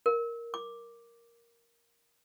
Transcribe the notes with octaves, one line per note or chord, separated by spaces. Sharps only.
A#4
D6